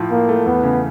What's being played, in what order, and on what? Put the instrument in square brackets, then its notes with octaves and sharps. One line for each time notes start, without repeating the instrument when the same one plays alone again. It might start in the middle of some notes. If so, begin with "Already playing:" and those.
Already playing: [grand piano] A2 F3
[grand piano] A2 [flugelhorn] A#3
[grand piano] A3
[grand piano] E2 [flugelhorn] B3
[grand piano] C#3